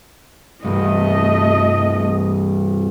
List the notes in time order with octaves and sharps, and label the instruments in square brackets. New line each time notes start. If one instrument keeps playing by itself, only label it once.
[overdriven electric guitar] C2 G2 [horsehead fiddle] A3 D#5